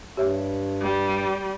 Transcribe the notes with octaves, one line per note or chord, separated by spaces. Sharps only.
G2 G4 C#5 E5
G3